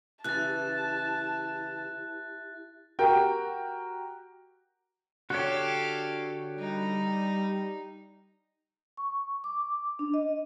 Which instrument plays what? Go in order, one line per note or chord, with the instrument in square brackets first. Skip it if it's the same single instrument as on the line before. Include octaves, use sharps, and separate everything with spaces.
[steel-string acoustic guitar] C#3 E3 [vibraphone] E4 G4 E5 [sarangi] A5 [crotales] F#6 A6
[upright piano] F#4 G4 A#4 G5
[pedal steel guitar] D3 G4 [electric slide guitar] F#4 C#5 [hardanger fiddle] A4 F5
[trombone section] G3 [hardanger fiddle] D#4
[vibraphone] C#6
D6
D4
D#5